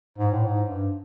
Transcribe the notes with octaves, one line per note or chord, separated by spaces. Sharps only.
G#2
A2
G#2
G2